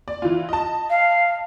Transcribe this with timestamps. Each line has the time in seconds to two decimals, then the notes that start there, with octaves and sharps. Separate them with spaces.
0.08 D5
0.22 E3 F4
0.49 D#5 A5
0.90 F5